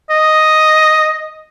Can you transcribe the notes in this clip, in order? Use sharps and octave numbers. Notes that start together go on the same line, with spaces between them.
D#5